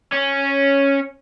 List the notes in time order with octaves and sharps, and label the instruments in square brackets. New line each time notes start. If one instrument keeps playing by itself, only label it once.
[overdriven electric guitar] C#4